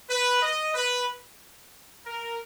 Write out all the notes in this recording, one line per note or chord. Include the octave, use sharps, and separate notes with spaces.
B4
D#5
B4
A#4